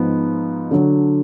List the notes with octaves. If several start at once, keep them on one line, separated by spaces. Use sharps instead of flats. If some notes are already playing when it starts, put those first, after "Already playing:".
Already playing: G#2 F3 B3 D#4
D3 F#3 D4